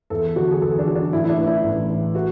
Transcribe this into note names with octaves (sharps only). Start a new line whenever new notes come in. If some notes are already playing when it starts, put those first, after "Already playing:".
E2 A4
D3 F#3 F#4
G#4
E2 A4
D4
D3 F#3
D4
A1 E4
E4
D4
A2 E3
E4
A1
A2 E3
F#4